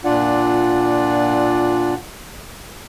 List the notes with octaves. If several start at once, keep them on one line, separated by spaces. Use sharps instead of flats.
A#2 D4 F4 D5 F#5